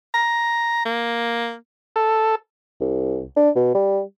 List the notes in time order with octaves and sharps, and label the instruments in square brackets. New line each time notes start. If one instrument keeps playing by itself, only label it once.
[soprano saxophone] A#5
A#3
[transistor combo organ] A4
[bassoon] C2
D4
B2
G3